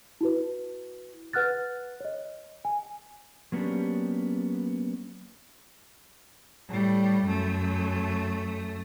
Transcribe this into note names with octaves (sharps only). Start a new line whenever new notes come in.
E4 F#4 B4
B4 F#5 F6 F#6 A6
C#5 D#5
G#5
F#3 A#3 B3 C#4 D4 G4
A2 G3
F#2 A3